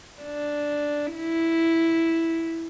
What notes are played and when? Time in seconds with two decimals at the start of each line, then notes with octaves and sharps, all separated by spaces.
0.22 D4
1.14 E4